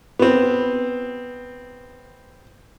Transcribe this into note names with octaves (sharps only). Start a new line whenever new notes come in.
B3 C4